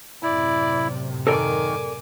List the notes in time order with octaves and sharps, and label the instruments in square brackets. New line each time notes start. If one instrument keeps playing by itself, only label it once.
[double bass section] F#2 A2 C3 [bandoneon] E4 [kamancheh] D5
[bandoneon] D#3 [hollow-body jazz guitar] A4 A#4 D5 [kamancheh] G#5 D6